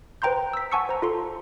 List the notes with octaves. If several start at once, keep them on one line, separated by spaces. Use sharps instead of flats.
B4 C5 G5 A#5 C6 G6
E6 B6
F#5 G#5 A5 C#6 E6 C#7
C5 A#5
F4 A4 C6